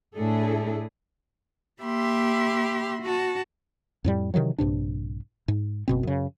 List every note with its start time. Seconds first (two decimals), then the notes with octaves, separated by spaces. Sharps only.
0.15 A2 A3 D4 E4 G#4 A4
1.82 A#3 G4 E5 B5 C6
3.01 F#4 A5
4.04 F2 A2 G3
4.34 C3 D#3 E3 F#3
4.58 A#1 G2 C3 D4
5.48 G#2
5.88 F#1 B2 C4
6.03 F#2 C#3